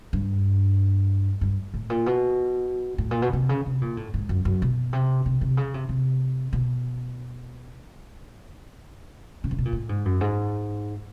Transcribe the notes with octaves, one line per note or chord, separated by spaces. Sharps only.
G2
G2
A2
A#2
B2
A2
A#2
B2
C3
C#3
C3
A#2
A2
G#2
F#2
F#2
B2
C3
C3
C3
C#3
C3
C3
B2
C#3
C3
B2
A#2
A2
G#2
F#2
G#2